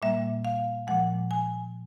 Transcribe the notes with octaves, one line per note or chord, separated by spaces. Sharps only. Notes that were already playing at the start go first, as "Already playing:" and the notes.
A#2 G3 A#3 E5
F5
A#2 F3 G#3 F#5
G#5